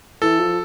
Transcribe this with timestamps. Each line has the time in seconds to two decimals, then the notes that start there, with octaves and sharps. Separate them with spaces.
0.22 E3 A4
0.40 F3